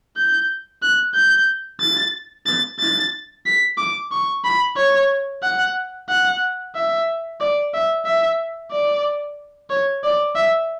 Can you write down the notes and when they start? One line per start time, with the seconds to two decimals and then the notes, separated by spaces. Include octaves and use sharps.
0.17 G6
0.82 F#6
1.14 G6
1.81 A6
2.46 A6
2.80 A6
3.46 B6
3.78 D6
4.12 C#6
4.44 B5
4.77 C#5
5.43 F#5
6.09 F#5
6.75 E5
7.40 D5
7.74 E5
8.05 E5
8.71 D5
9.70 C#5
10.04 D5
10.36 E5